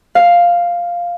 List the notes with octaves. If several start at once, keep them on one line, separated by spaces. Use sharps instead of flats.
F5